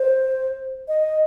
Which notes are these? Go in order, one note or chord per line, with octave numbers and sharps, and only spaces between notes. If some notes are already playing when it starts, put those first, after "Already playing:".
Already playing: C5
D#5